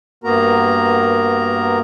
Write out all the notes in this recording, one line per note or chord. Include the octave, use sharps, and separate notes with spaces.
G2 A#3 B3 F#4 A#4 A#5